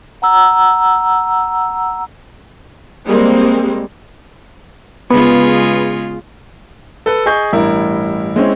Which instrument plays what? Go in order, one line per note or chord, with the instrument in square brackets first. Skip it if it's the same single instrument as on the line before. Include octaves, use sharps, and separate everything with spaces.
[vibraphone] F#5 A#5 E6
[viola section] G3 G#3 A#3 C4
[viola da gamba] C#3 G#3 F4 [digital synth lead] B3
[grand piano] A4 B4
G#4 D#5 G#5 C#6 G6
A1 G2 E4 A#4
G#3 C4 C#4 E4